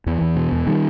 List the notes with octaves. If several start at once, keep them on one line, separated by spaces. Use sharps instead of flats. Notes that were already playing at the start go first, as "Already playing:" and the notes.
E2 E3
E2
B2
E2
D#3 G3